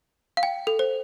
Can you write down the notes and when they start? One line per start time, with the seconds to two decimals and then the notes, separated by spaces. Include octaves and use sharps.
0.37 F5
0.43 G5
0.67 A4
0.79 C5